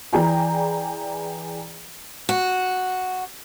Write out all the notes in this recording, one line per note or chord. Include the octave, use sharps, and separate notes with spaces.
E3 G#4 D5 G5 A#5
F#4